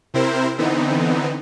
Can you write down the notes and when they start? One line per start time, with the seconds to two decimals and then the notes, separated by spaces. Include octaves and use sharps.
0.14 C3 C4 E4 A#4 C5
0.58 D3 E3 B3 C4 D#4